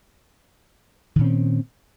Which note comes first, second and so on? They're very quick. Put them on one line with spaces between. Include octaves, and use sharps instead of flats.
D#3 A#2 C#4 C4